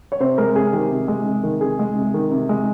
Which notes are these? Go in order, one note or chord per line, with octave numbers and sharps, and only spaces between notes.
C#5
C3 C5
G#3 A#4
C3 G#4
D#3 G4
C3
G#3
C3
D#3
C3 G#4
G#3
C3
D#3
C3
G#3